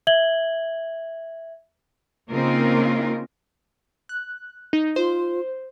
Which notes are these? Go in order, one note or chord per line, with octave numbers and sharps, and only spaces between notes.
E5 G#6 F#7 G7
C#3 A#3 C4 D#4 F4 A#4
F#6
D#4
F4 C5